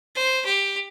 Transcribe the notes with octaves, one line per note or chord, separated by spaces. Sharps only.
C5
G4